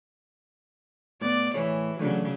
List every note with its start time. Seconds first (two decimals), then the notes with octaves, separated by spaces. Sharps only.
1.21 A2 B3 D5
1.54 A2 E3 G#4 C#5
1.99 C#3 E3 F#3 A3 D4